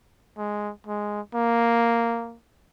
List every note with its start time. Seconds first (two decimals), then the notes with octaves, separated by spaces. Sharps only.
0.38 G#3
0.87 G#3
1.35 A#3